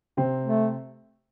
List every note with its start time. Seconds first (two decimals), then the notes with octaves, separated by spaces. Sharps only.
0.17 C3 C4
0.44 A3